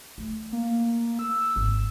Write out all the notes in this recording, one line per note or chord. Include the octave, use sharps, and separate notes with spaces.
A3
A#3
E6
G#1